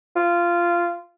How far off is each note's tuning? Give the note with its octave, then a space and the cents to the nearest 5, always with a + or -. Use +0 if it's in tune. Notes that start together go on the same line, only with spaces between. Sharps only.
F4 -15